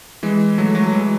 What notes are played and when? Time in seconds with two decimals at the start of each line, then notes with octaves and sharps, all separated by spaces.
0.23 E3 G#3
0.58 F#3 A3
0.75 F#3 A3
0.92 E3 G#3